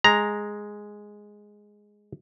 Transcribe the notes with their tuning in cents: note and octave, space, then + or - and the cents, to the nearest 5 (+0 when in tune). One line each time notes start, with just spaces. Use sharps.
G#3 +0 A#5 +0